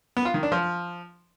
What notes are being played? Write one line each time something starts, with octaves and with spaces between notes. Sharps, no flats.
B3
F4
D#3
D4
F3